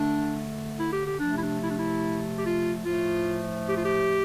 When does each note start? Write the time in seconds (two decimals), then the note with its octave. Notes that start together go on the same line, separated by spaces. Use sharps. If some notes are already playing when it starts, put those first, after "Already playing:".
Already playing: D3 A3 D4
0.79 E4
0.93 G4
1.07 G4
1.20 C3 F3 A3 D4
1.37 E4
1.42 D4
1.63 E4
1.71 D4
1.79 E4
2.38 G4
2.45 F4
2.86 A2 F3 A3 F4
3.68 G4
3.77 F4
3.85 G4